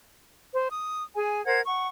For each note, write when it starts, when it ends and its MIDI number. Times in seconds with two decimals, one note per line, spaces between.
0.54 0.68 72
0.71 1.03 87
1.16 1.44 68
1.16 1.44 80
1.46 1.60 70
1.46 1.60 72
1.46 1.60 78
1.46 1.60 92
1.66 1.87 78
1.66 1.87 85